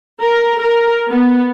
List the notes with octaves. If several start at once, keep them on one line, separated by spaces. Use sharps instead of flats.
A#4
A#4
B3